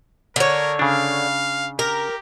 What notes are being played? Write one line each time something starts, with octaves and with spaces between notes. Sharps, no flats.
D3 A#4 C#5
C#3 D4 F5
G4 A#4